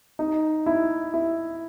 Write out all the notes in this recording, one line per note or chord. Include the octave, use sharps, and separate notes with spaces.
D#4
E4
E4